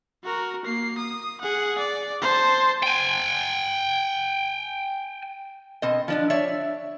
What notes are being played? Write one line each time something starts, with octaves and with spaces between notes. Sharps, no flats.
F#4 A#4
A#3 C7
D#6
G#4 F#5
D5
C5 A5
G5 G#5
B2 C4 D#5
F3 D4 F4
C#5 D5 E5